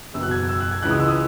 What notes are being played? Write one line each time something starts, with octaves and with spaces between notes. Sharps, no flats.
F#1 E2 B2 E6
F#6
G#6
E6
F#6
G#6
C#2 C#3 E3 G#3 F#6
D#6
E6
D#6